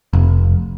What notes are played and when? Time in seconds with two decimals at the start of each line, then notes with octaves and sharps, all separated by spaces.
0.13 F1